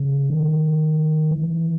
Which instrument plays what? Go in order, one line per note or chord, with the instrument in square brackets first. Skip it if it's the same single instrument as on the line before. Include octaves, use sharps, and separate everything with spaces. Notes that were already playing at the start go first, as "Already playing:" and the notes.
Already playing: [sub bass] C#3
D#3
E3